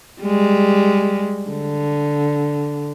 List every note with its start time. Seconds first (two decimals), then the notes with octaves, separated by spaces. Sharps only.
0.22 G3 G#3
1.49 D3